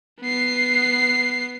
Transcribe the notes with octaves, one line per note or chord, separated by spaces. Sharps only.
B3 C7